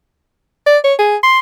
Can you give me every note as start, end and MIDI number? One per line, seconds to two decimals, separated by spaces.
0.66 0.77 74
0.84 0.94 73
0.99 1.16 68
1.23 1.39 84